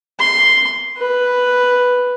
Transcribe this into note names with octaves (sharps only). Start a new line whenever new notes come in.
C6
B4